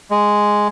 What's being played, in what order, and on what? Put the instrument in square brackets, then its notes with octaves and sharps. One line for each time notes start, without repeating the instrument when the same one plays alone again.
[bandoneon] G#3